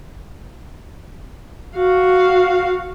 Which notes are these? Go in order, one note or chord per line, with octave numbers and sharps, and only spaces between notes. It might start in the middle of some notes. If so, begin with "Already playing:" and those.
F#4 F5